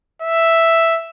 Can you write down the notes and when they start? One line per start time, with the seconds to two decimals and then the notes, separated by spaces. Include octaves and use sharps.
0.22 E5